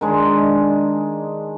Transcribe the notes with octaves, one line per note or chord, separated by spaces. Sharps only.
D#3 G#3 D4